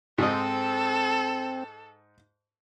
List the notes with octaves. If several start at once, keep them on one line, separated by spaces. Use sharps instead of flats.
G#2 C4 A4 D#5